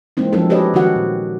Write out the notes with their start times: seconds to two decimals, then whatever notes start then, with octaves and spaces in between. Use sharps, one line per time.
0.17 E3 G#3 A#3 C4 D#4
0.33 F3 F#3 C4 C#4 D#4 A4
0.50 F#4 G4 A4 B4 C#5 D#5
0.74 D#3 F#3 D#4 F#4 F#5
0.96 A#2